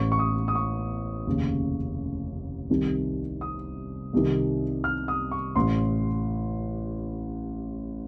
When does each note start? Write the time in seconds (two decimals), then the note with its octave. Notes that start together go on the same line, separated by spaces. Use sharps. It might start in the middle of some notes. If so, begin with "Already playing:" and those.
Already playing: A1 A2 C#6
0.12 C#6
0.19 D#6
0.48 D#6
0.55 C#6
1.27 F1 D#2 C#3
2.70 C2 C3 D#3
3.41 D#6
4.13 C2 C3 D#3
4.84 F6
5.08 D#6
5.31 C#6
5.56 A1 A2 C6